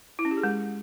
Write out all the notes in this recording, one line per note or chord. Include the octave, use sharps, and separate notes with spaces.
E4
C#4
G4
G#4
G#3